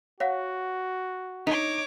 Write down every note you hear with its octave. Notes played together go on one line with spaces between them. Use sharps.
F#4 C#5 F5 F#5
D#4 C#5 D6 B6 F7